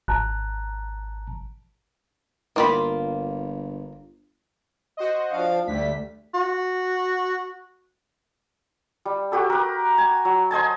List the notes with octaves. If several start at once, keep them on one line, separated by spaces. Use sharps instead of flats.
G#1 A5 A#5 F#6
G1 A#3 F4 B5
F#4 C5 D#5
F3 D4 F5
D2 D3 G3 A3 B6
F#4
G3
F#4 G4 A4
A#4 B4
G#5
F#3
C5 D#5 G#5 A5